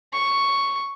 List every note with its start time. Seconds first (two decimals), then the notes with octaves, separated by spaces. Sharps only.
0.13 C#6